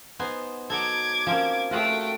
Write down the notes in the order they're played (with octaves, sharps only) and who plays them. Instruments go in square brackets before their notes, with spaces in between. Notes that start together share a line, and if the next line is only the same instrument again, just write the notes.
[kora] B3 [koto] D#4 C5 G#5
[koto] F#3 D#4 A4 [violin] D6 G#6
[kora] F3 C4 [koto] A#3 C#4
[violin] A3 G5 [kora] F4 F#4 G#4